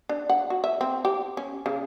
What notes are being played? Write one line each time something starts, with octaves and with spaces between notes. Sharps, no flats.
D4
F#5
F#4
E5
C4
G4
C#4
C#3